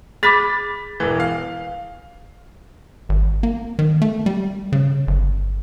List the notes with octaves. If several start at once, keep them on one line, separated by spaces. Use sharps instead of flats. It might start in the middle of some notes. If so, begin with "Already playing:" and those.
G#4 B5 D6 A6 B6
E1 E3
F5
G#1
A#3
D#3
A3
G3
C#3
G1